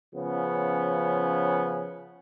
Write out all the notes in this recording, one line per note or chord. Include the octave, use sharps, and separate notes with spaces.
C#3 F3 B3 C#4